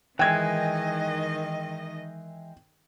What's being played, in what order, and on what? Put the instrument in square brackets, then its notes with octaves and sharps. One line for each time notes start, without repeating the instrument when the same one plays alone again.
[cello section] D#3 D#5 [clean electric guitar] E3 G#3 [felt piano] G5 G#6